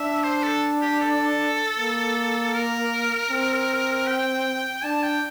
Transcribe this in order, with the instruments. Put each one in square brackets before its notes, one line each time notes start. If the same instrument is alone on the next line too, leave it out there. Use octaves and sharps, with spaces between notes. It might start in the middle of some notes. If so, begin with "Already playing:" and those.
Already playing: [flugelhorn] D4 [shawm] E5
[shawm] C5
A4
G4
A4
[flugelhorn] A#3
[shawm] A#4
[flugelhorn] C4
[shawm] G5
[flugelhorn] D4 [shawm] A5
[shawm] G5